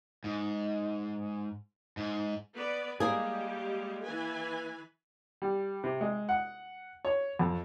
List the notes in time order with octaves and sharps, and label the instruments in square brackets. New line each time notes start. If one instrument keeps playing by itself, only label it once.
[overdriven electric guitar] G#2
G#2
[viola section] B3 B4 D5
[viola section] G3 G#3 G4 [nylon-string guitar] A#3 G#4
[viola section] E3 B4 G#5
[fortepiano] G3
C3
G#3
F#5
C#5
F2